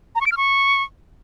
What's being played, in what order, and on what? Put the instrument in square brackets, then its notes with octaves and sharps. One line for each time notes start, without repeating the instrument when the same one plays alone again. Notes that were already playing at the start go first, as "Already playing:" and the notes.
[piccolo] A#5
C#6
D7
F6
C#6